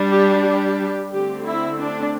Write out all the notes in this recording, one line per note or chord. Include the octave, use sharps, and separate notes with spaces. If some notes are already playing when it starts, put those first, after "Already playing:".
Already playing: G3 D4
G4
G4
D3 A3 C4 G4
E4
D4